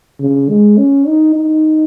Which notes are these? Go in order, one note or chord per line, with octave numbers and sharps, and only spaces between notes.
C#3
G#3
C#4
D#4
D#4